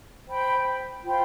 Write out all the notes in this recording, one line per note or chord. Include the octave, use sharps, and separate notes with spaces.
C5 G5 B5
F4 C5 G5 B5